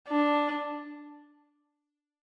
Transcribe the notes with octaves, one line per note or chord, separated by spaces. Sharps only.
D4